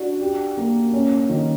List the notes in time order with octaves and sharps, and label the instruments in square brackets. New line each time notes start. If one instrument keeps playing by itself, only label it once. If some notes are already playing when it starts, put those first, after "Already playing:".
Already playing: [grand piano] D4 F#4
G4
A#3
C#4
D#3